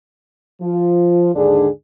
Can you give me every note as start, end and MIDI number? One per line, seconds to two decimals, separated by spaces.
0.61 1.30 53
0.61 1.30 65
1.35 1.67 39
1.35 1.67 44
1.35 1.67 50
1.35 1.67 62
1.35 1.67 68